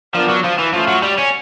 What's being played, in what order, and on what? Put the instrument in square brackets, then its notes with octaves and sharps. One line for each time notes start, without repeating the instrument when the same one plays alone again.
[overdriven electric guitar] F3 [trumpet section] B3 D4 F4 A#4 D5
[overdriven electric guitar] F#3
F3
E3
[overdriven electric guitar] F3 [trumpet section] A3 C#4 F4
[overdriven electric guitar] F#3
G3
C#4